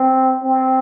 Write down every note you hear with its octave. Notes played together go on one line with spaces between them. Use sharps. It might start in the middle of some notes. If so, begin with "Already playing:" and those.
Already playing: C4
C4